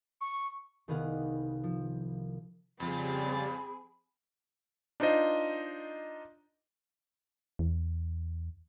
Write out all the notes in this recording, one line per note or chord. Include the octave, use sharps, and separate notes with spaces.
C#6
C2 D#3 B3 G#4 F5 F#5
F3
F2 C#3 F3 G3 C4 G#4 B5 A6
D4 D#4 F4 C5 D#5
E2